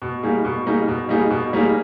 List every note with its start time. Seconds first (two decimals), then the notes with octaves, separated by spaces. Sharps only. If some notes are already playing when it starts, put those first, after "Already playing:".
0.02 B2
0.23 G3 A#3 D#4 G#4
0.45 B2
0.66 G3 A#3 D#4 G#4
0.88 B2
1.09 G3 A#3 D#4 G#4
1.30 B2
1.53 G3 A#3 D#4 G#4